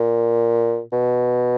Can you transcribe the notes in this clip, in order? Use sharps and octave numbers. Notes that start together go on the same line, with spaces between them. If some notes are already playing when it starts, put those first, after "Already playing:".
Already playing: A#2
B2